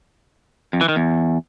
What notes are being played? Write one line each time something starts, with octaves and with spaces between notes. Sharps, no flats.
F2
E3
D#3
E2